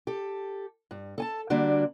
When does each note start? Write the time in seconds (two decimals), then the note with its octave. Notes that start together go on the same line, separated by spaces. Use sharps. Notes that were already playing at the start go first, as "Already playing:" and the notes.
0.07 G4 A4
0.91 G2
1.18 A4 G#5 A5
1.50 D3 G3 A#3 D4 F#4